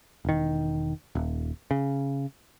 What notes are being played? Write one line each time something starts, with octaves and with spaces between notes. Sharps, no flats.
E1 D#3
D#1
C#3